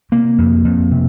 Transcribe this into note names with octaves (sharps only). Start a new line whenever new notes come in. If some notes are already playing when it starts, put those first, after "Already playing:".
C3 A#3
F2
F2
C3